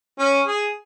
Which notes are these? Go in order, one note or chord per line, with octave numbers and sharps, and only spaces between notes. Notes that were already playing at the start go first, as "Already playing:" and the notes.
C#4
G#4